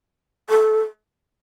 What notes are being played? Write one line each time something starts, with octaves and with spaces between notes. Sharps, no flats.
A4